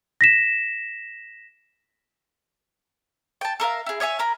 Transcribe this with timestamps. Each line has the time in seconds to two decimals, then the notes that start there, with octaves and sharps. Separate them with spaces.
0.21 A#6 B6 E7
3.41 G5 A5
3.60 A4 A#4 E5 F5
3.86 E4 G#4
4.00 C#5 D#5 E5 G#5
4.19 A#4 A#5 B5